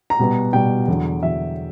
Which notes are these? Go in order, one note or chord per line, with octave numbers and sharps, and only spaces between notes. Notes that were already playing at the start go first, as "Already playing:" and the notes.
A#5
B2 G3 B3
B2 G3 B3 G5
E2 D3 F#3
E2 D3 F#3 E5